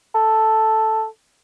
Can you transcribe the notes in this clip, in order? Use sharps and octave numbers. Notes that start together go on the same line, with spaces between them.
A4